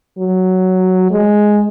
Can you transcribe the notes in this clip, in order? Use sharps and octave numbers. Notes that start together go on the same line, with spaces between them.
F#3
G#3